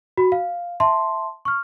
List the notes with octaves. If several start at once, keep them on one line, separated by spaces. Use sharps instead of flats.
F#4 B5
F5
E5 A5 C6
C#6 F6